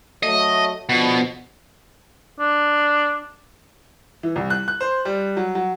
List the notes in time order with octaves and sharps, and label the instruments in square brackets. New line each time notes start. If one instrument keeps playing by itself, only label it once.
[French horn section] F#3 A3 [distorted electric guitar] D#5
[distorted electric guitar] B2 [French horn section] D3 F3
[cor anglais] D4
[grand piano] E3
C2
F#6
F#6
C5
G3
F#3
F#3